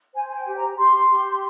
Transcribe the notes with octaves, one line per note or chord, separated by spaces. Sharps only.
C5 G#5
G#5
G5
G4
A#5
G4 C6
G4